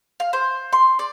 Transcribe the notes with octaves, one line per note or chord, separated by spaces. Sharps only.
F5
C5
C6
D5